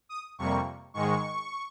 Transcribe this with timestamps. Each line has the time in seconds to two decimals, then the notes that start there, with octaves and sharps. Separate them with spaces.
0.09 D#6
0.39 F2 C3 G3 A#3 C#6
0.94 G#2 D#3 G#3 C#6